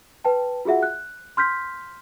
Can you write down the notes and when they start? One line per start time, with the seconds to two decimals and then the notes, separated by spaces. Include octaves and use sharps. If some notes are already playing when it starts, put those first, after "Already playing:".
0.24 B4 G5 A5
0.65 F4 F#4 G#4 E5 F#5
0.83 F#6
1.37 C6 F6 G6 B6